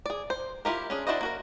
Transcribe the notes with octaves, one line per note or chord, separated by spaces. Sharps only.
G#4 D5
C5
E4 F4 G4 A#4
C#4 D4 G#4
D4 E4 F#4 C5 D#5
A#3 F#4 A#4